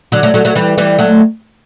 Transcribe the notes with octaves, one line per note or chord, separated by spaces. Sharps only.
D3 F#3
F#3 A3
F#3 A3
F#3 A3
E3 G3
E3 G3
F#3 A3